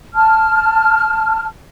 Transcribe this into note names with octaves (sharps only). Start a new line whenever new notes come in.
A5 F6